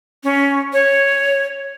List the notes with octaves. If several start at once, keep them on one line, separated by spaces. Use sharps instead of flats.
C#4
C#5